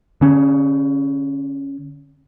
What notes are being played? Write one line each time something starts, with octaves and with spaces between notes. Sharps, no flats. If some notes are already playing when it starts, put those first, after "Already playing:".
D3 C#4